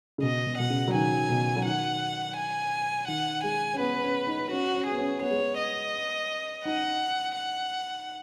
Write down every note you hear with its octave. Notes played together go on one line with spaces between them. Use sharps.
C#3
B2 D#5
B2
B2 F#5
C#3
F#3
D#3 G#5
B2
F#3
D#3 F#5
G#5
D#3 F#5
G#3 G#5
C#4
B3 B4
C#4
D#4
C#4 F#4
C#4
B3 G#4
C#4
B3 C#5
G#3
B3
D#5
D#4 F#5
F#5